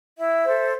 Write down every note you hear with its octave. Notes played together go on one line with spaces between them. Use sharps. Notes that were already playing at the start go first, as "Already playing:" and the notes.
E4 E5
A4 C5